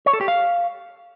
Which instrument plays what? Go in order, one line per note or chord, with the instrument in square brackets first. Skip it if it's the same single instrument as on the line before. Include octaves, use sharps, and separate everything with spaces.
[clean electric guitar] C#5
A4
G4
F5